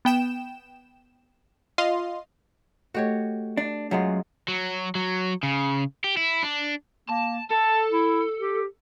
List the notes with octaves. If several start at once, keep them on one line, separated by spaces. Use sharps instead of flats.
B3 G5 E7
F4 D#5 F5 C6
A3 F#4 G4 A4 C#5 D#5
D4
F#2 F#3 G#3 F4
F#3
F#3
C#3
G4
E4
D4
A#3 A5
A4 A5
E4
G4